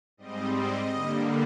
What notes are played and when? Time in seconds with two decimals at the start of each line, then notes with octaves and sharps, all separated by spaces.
0.17 G#2 G3 C4 D#5
0.54 D#5
0.92 D3 G3 A#3